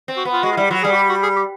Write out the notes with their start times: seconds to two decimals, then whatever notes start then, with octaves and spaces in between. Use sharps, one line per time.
0.08 C4
0.17 F#4
0.25 B3
0.33 F4
0.43 G#3 F#4
0.52 F4
0.56 G3 E4
0.70 F#3 F4
0.83 G3 G#4
0.92 F#4
0.96 G4
1.09 F#4
1.23 G#4
1.36 G4